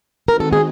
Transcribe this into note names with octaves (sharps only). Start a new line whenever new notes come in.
D#3 G#3 C4 D#4 F#4 A#4
A4
G#4